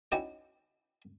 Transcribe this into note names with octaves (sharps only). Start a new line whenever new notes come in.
C#4 D#4 E4 F#4 D5 G5